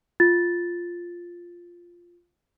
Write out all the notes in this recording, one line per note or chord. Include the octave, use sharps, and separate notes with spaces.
F4 A6